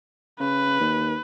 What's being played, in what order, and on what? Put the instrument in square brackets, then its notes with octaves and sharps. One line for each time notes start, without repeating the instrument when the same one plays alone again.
[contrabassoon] C#3 [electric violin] B4
[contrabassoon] D#2